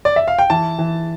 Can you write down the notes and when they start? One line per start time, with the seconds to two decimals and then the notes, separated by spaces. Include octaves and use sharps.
0.05 D5
0.16 E5
0.28 F5
0.38 G5
0.50 E3 A5
0.79 E3